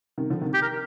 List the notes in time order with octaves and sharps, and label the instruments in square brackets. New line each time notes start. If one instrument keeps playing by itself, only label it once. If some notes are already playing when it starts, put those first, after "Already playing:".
[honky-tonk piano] C3 D#3
D3 F3
C3 D#3
[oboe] G4
A#4